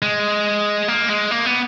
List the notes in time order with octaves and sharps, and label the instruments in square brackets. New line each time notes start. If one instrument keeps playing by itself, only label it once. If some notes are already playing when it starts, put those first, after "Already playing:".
[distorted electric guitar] G#3
A#3
G#3
A#3
B3